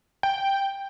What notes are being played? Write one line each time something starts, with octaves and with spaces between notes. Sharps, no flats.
G5